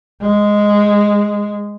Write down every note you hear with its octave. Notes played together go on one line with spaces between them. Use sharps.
G#3